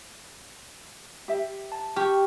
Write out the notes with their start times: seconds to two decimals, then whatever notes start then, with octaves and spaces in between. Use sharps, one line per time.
1.28 G4 E5
1.72 A5
1.96 G4 C#6 F6